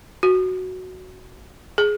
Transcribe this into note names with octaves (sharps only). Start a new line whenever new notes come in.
F#4
G#4